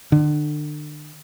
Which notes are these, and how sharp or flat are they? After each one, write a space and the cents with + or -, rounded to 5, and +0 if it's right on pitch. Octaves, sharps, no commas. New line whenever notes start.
D3 +35